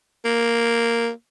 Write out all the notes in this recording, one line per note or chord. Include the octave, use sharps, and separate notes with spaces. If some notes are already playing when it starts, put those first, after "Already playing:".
A#3